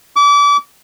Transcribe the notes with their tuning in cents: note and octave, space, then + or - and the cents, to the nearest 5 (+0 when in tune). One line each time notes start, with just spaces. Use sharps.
D6 -30